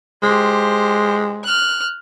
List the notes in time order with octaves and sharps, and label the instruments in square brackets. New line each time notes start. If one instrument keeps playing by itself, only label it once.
[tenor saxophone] G#3 [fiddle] G4 C5
[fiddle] F6 F#6